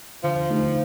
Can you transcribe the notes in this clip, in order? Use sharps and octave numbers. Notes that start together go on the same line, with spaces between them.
D3 F3
A3 D#4 G4